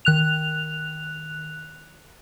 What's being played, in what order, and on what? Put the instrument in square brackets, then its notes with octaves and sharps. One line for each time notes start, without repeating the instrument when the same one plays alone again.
[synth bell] D#3 F#6 F7